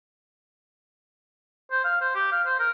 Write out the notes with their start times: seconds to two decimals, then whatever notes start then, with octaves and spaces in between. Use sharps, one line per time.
1.72 C5
1.84 F5
2.01 C5
2.15 G4
2.32 F5
2.46 C5
2.59 A#4